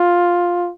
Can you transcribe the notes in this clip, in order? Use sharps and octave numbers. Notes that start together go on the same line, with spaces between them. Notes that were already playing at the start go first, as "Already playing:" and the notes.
Already playing: F4